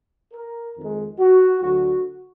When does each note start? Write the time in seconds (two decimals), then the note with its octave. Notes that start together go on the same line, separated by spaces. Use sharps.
0.33 A#4
0.76 F2 D#3 G#3
1.18 F#4
1.61 D2 D3 F#3 F#4